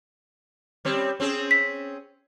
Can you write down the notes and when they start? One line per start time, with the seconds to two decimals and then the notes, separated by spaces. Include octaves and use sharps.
0.85 G3 C4 C#5
1.20 C4 C#4 G#4
1.51 B6